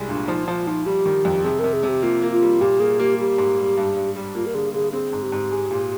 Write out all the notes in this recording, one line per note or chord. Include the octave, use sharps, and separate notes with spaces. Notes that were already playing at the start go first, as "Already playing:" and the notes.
Already playing: C2 G3 G#3
A#2 D4
F3 D#4
F3 F4
F3 D#4
G3 G4
D#3
F2
C3 G#4
C3 A#4
G#4
C3
G4
A#3 F4
A#3
F4
G3
A#2 G4
A#3 G#4
A#3 G4
G3 G4
G#2
G3
G2
G2
G3
A#3 F4
A#4
D3 G#4
D3 G#4
C4 G#4
G#2
G4
G#2
G#3
A#2